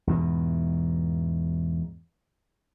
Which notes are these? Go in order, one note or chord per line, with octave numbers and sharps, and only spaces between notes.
E2 G#2 B2